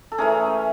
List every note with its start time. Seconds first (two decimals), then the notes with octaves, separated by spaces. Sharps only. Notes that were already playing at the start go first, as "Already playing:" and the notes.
0.12 A4
0.18 E3 A3 C#4 G#4 A#4